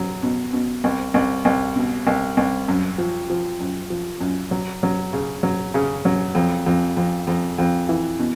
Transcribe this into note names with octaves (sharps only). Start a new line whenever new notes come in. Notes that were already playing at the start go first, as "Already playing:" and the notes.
Already playing: F#3
B2
B2
C2
C2
C2
B2
C2
C2
F#2
F3
F3
F#2
F3
F#2
F#3
F#3
C#3
F#3
C#3
F#3
F2
F2
F2
F2
F2
E3
B2